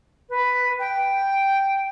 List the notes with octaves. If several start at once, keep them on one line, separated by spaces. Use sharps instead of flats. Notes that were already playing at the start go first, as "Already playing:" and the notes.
B4
G5